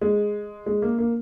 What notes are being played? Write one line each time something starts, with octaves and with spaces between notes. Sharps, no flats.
G#3
G#3
A#3
A#3